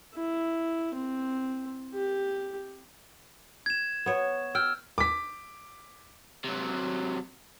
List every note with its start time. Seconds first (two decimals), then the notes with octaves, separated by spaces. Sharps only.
0.15 E4
0.94 C4
1.94 G4
3.66 G#6 E7
4.06 B3 C#5
4.55 G5 E6 F6
4.98 D6 B6
6.45 C3 F#3